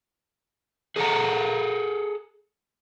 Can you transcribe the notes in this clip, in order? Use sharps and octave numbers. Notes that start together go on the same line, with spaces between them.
G#4 A4 C5 F#5 A#5